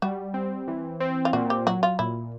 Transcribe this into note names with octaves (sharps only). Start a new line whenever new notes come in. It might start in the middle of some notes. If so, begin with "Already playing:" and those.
G3 F#4
C4
E3
C4
F4
A#2 F#4
G4
F#3 F#4
F4
A#2 E4